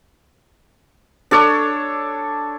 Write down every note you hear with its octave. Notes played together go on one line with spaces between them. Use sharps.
D4 A4 C#5